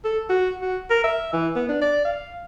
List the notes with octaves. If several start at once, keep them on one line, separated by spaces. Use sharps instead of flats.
A4
F#4
F#4
A#4
E5
E3
B3
D4
D5
F5